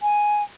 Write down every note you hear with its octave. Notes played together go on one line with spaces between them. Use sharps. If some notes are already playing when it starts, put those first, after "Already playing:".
G#5